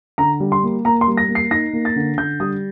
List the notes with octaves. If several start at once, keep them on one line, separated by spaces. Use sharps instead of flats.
D3 A#5
G3
C6
A#3
A#3 A#5
C6
G3
A#6
A#3
C7
D#4 A#6
A#3
A6
D3
D3 G6
G3 D#6